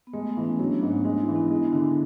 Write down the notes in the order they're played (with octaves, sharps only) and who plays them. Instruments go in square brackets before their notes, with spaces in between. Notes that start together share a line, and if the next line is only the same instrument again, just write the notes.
[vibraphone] B3
[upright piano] G#3 [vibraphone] A3
[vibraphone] B3
[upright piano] E3
[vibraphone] C#4
[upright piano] F#3 [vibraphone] D4
[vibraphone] B3
[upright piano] G#2
[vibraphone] A3
[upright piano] G#3 [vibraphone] D4
[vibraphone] E4
[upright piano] E3
[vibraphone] B3
[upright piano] G#3
D3